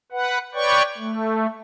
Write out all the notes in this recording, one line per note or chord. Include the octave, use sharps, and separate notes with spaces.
B4 F#5
B4 C#5 D5 G5 C#6
A3